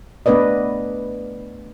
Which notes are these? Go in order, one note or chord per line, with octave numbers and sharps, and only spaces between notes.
A3 B3 D4 B4 D5 D#5